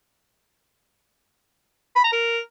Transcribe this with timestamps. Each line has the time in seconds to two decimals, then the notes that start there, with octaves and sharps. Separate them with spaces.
1.96 B5
2.04 A#5
2.13 A#4